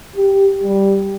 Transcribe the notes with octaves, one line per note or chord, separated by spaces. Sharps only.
G4
G3